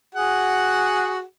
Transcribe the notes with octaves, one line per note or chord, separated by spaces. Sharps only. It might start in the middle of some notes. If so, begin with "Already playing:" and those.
F#4 G#4 F#5